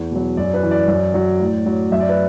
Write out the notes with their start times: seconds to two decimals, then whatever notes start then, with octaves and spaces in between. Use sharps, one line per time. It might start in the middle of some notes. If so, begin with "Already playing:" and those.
Already playing: E2
0.11 B2 F#3
0.37 F#2 D5
0.54 B4
0.63 E3
0.71 D5
0.88 F#2
1.14 F#3
1.40 A2
1.66 F#3
1.92 F#2 E5
2.00 D5
2.09 B4